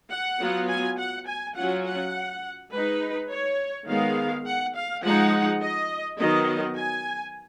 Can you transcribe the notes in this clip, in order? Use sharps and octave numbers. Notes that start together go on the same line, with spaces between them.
F#5
F#3 B3 F4
G#5
F#5
G#5
F#3 C#4 F4 F#5
F#5
G#3 D#4 B4
C#5
D#3 G#3 B3 F5
F#5
F5
F3 G#3 D#4 F#5
D#5
D#3 F#3 B3 D#5
G#5